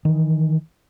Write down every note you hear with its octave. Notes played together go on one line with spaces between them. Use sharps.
D#3 E3